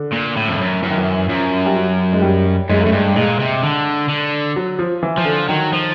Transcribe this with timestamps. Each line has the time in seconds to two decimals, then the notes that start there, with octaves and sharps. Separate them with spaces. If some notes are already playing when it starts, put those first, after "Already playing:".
Already playing: D3
0.12 A#2
0.36 A2
0.48 F2
0.59 F#2
0.82 F#2 E3
0.90 D#3
0.98 E3
1.29 F#2 F3
1.66 G3
1.76 F#3
2.13 G#3
2.22 G3
2.69 F#2 G#3
2.81 F#2 A3
2.92 G2 G#3
3.16 A#2 G#3
3.40 C3
3.63 D3
4.09 D3
4.56 F#3
4.79 F3
5.03 E3
5.18 F3
5.25 D3
5.48 D#3 F#3
5.73 F3